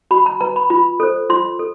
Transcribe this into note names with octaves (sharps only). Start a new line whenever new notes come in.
F#4 B5
A#5
B4 A#5
B5
F4 B5
A4 C5
F4 C6
A4